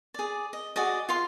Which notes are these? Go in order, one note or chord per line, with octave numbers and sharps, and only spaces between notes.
G#4 D5
D#5
F#4 G#4 D5 D#5
F4 F5 C6